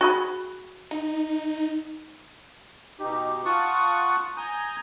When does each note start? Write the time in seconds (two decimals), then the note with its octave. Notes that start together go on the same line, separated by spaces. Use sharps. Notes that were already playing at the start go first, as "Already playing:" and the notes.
0.01 F#4 G#4 B5
0.91 D#4
3.00 B2 D#4 G4
3.45 F4 F#5 A5 C#6 D#6
4.37 G#5 A#5 D#6 G6